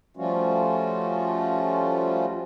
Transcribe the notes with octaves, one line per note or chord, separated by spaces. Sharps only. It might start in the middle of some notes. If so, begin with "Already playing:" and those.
F3 G3 A3 C#4 F4 F#4